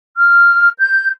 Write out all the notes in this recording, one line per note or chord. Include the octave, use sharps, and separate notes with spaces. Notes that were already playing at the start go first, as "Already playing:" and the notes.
F6
G6